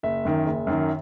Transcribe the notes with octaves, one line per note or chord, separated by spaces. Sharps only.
F#1 E5
F#2 D#3
F#1
F#2 D#3